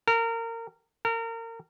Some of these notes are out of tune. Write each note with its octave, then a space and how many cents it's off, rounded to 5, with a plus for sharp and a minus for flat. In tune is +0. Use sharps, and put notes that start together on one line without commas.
A#4 -25
A#4 -30